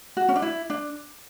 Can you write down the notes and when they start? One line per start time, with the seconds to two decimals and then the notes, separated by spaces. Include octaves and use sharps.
0.17 F#4
0.28 C#4
0.36 D4
0.42 E4
0.70 D4